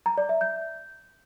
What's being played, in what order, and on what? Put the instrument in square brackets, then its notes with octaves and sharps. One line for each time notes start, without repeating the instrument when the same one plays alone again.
[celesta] A#5
D5
E5
G6